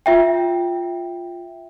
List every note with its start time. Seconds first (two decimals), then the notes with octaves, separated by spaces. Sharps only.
0.06 F4 E5 G5